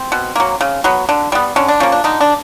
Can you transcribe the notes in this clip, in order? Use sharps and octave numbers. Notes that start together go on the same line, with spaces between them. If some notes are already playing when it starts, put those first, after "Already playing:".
Already playing: C4
B2
F#3 A#3
C#3
F#3 B3
D3
G3 B3
D3 C#4
D4
F3 A#3 C#4
D4
D3 D#4
D4